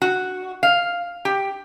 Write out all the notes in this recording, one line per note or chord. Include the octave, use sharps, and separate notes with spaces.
F#4
F5
G4